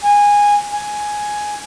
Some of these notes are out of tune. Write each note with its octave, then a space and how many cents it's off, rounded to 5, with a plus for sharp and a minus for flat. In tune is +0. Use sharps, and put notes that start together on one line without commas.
G#5 -15
G#5 +5